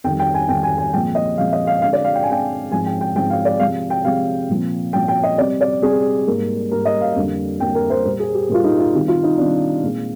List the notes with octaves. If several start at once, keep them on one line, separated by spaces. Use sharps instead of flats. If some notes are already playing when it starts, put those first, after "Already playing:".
F2 D#3 G3 G5
G5
G#5
F2 D#3 G3 G5
G#5
G#5
A#2 F3 G#3 C4 G5
D#5
A#2 F3 G#3 C4 F5
D#5
F5
D3 G#3 C4 F5
D5
F5
G5
G#5
D3 G#3 C4 G5
G#2 F3 C4 G#5
G5
G5
G#2 F3 C4 G5
F5
D5
C3 F3 G#3 F5
G5
C3 F3 G#3 F5
A#2 F3 C4
A#2 F3 C4 G5
G5
D#5
C3 G3 C4 D5
D5
C3 G3 C4 G#4
G#2 G3 A#3
G#2 G3 A#3 A#4
D#5
F5
F2 D3 G3 A#3
F2 D3 G3 A#3 G5
A#4
C5
A#2 G3 A#3 A#4
G#4
G4
A#2 G3 A#3 F4
D#4
F4
C3 D#3 G3 C4 G4
F4
D#4
C3 D#3 G3 C4 D4
A#2 G#3 C4